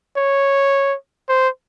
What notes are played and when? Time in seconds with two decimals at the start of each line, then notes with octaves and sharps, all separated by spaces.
0.17 C#5
1.29 C5